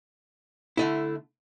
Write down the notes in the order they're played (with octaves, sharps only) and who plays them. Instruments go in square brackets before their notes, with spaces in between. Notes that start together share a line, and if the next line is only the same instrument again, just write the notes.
[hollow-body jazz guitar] D3 A3 E4